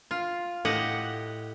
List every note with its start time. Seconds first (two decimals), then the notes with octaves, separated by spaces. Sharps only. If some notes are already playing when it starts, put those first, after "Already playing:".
0.11 F4
0.65 A2 G4 D#5 F#5